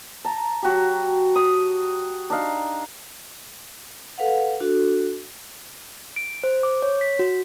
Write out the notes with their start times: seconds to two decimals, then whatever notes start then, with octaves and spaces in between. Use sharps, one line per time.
0.24 A5 A#5
0.62 F#3 F#4 G4
1.35 D#6
2.30 D4 D#4 F5
4.18 A4 B4 F5 F#5
4.60 D4 F#4 A4
6.16 D7
6.44 C5
6.63 D6
6.82 C#5
7.01 B6
7.19 F#4